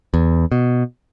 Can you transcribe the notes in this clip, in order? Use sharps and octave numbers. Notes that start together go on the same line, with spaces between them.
E2
B2